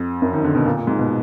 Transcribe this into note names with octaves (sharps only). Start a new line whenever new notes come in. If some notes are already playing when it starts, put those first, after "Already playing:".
Already playing: F2
F#2
D#3
D3
B2
A#2
A#2
G#2
B2